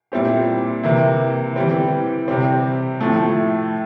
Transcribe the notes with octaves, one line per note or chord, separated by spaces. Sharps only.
A#2 G3 C4 E4 G4
C3 E3 A#3 E4
E3 G3 C4
C3 G3 C4
A2 F3 A3 E4